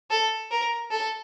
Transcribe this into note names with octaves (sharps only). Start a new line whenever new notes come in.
A4
A#4
A4